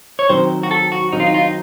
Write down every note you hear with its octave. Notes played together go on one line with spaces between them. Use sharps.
C#5
D#3 F#3 C4 C5
F#4
A4
F#4
D#3 F#3 C4 D#4
F4
D#4
F4
D#4